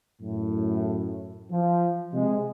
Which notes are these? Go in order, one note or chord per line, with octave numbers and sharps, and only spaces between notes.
F#2 A2
F3
C3 G#3